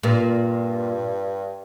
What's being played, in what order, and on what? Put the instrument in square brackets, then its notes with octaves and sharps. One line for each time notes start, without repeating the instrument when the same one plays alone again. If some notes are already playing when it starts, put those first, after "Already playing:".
[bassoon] G2 [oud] A#2